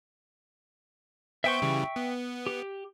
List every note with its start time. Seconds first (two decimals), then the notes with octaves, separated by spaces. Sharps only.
1.44 B3 C5 E5 G5 C#6 G6
1.62 C#3 E3 G3
1.96 B3
2.46 G4